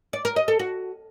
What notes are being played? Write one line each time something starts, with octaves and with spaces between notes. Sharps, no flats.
D5
A#4
D#5
A4
F#4